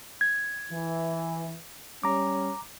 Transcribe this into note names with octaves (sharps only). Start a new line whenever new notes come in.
G#6
E3
G3 C#4 A#5 D6